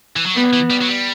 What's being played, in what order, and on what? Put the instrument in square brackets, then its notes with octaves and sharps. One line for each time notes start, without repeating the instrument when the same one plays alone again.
[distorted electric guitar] E3
F#3
[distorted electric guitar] G3 [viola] B3
[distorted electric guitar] E3
G3
F#3
G3